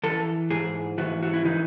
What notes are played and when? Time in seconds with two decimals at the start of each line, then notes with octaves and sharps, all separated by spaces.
0.03 E3 A4
0.50 G#2 G#4
0.98 E3 F#4
1.22 F#4
1.34 E4
1.45 E3 D#4